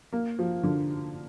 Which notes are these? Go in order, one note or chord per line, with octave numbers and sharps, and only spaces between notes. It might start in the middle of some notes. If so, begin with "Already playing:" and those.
A#3
F3
D3